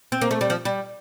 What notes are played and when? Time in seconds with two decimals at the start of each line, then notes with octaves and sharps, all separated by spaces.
0.12 C4
0.21 A#3
0.31 A3
0.41 G3
0.50 F3
0.65 G3